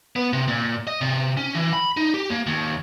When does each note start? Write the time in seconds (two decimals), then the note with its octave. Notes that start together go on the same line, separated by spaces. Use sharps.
0.16 B3
0.33 C3
0.48 A#2
0.87 D#5
1.01 C3
1.37 C#4
1.55 E3
1.73 B5
1.97 D#4
2.14 G4
2.30 A#3
2.47 D#2